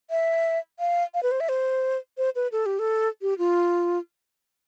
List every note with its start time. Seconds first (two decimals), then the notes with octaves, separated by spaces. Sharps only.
0.10 E5
0.79 F5
1.14 F5
1.23 B4
1.31 C5
1.40 E5
1.49 C5
2.18 C5
2.35 B4
2.52 A4
2.66 G4
2.79 A4
3.22 G4
3.38 F4